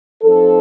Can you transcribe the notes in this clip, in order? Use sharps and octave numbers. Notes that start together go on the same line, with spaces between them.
F3 C4 D#4 A4